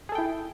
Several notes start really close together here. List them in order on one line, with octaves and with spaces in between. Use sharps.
G#4 A4 G5 E4